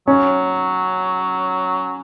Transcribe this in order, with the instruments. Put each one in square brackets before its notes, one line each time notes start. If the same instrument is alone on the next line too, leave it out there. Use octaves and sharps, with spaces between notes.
[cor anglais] F#3 [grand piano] C#4